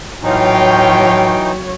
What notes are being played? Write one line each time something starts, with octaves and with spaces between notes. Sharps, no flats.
A2 E3 F#3 D#4 F4 C#5 G5